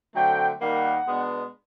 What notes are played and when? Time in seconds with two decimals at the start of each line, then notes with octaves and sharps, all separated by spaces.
0.15 D3 F#3 A3 C4 G5
0.61 D#3 G3 A#3 D#4 F#5
1.06 B2 G#3 B3 D4